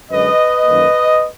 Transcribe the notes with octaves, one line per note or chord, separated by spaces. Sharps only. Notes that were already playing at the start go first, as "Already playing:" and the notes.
F#2 D3 G#3 B4 D#5
F#2 D#3 A#3